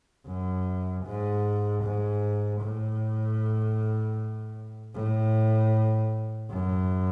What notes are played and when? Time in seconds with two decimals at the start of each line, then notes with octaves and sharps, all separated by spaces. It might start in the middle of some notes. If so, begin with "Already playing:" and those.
0.26 F#2
1.05 G#2
1.83 G#2
2.61 A2
4.94 A2
6.51 F#2